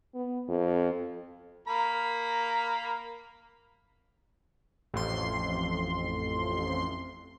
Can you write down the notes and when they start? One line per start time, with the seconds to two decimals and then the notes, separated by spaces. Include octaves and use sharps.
0.14 B3
0.49 F2
1.67 A#3 A#5 B5
4.94 A1 F2 C6